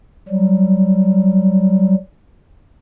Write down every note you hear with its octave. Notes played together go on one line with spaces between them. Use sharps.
F#3 G3